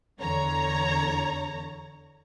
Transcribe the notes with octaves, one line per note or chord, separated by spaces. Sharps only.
E2 D3 C#5 A#5